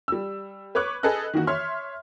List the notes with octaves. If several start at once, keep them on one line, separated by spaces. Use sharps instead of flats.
G3 E6
B4 C#5 C#6 D6 F#6
G#4 A4 B4 D#5 F#6
D#3 E3 A#3 F#4
C#5 E5 C6 F6